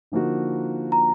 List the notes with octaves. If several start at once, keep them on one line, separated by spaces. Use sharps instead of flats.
D3 F3 A#3 D#4 F#4
A#5